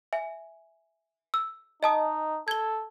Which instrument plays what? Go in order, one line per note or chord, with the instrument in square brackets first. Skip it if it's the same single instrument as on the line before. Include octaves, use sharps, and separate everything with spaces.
[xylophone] E5 G#5
E6
[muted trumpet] D#4 [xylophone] D#5 A5 D#6
[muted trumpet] A4 [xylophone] G#6 G7